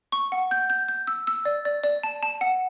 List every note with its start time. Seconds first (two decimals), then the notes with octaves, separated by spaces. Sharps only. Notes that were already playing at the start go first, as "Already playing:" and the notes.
0.12 C#6
0.32 F#5
0.51 G6
0.70 G6
0.89 G6
1.07 E6
1.27 E6
1.45 D5
1.65 D5
1.84 D5
2.03 A5
2.23 A5
2.41 F#5